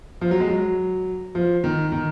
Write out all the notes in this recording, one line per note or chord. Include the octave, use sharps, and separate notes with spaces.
F3
F#3
G#3
F#3
F3
D#3
D#3